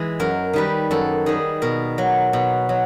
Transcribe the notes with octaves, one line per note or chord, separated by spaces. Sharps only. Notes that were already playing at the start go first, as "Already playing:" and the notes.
Already playing: E3 G#3
F#2 A#4
D#3 G3 B4
F#2 A4
D#3 G3 G#4
B2 A#4
F#3
B2
F#3